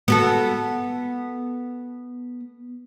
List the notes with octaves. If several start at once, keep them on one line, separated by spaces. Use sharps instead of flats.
B3 F#4 A4